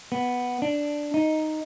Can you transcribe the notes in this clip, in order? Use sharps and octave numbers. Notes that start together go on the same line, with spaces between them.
B3
D4
D#4